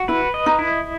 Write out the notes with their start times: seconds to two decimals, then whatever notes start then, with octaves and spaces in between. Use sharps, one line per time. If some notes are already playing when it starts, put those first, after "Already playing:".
Already playing: F#4
0.08 E4 B4
0.34 D#5
0.46 D#4
0.59 E4